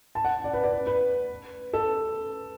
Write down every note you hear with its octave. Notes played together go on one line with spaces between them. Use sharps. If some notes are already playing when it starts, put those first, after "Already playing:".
A5
F#5
D5
B4
D5
B4
B4
A4